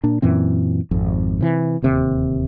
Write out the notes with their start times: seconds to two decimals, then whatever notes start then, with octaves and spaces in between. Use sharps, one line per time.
0.03 A#2 D4
0.22 F#2 A#2 E3 C4
0.91 G#1 F2
1.41 C3 E3
1.82 D1 D#2 C3